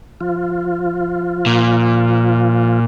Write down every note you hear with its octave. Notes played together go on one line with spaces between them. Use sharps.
F3 F4
A#2